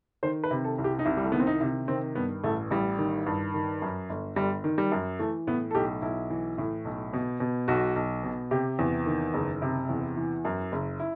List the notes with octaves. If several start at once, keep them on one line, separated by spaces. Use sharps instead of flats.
D#3 C5
B4
C3
A4
C2
G4
D#4
C2 E4
G3
A3
D#3 B3
C4
D#4
C3
D#3 C4
G2 B3
A1 A3
A1 G3
D#3
G2
D#3
F#2
G1
G1 G3
D#3
G3
F#2
E3 A3
A2 B3
A4
B1 G4
B1 E4
E3
A2
B1
B2
B2
B1 F#4
B1
B2
C3 G4
E2
D#3
F#1
C3
E2
E3
F#2
F#1
E4